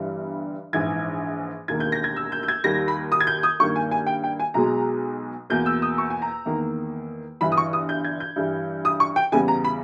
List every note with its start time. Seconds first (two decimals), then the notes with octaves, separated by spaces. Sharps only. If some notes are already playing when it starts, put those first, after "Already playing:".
Already playing: G1 G2 E3 G3
0.73 A#1 G#2 E3 G#6
1.68 E1 D#2 D#3 A#3 G#6
1.80 G6
1.92 A#6
2.04 G#6
2.16 E6
2.32 G6
2.43 G6
2.48 G#6
2.64 D#2 D#3 G3 A#6
2.88 B5
3.12 D#6
3.20 G#6
3.27 G6
3.43 D#6
3.59 G2 D#3 A#3 C#6
3.76 G#5
3.91 G#5
4.07 G5
4.24 G5
4.40 G#5
4.54 B1 B2 G#3 A#5
5.50 E2 B2 A#3 G6
5.66 E6
5.82 D#6
5.98 C#6
6.10 G#5
6.22 A#5
6.45 E2 D#3 A#3
7.41 G1 G2 E3 B5
7.52 D#6
7.57 C#6
7.73 D#6
7.89 G6
8.04 G#6
8.20 G6
8.36 G2 E3 G3
8.85 D#6
9.00 C#6
9.16 G5
9.32 E2 C#3 G3 B3 G#5
9.48 A#5
9.64 B5